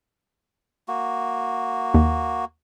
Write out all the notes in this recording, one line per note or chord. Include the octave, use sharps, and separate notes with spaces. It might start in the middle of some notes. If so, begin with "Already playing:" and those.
A#3 F#4
D#2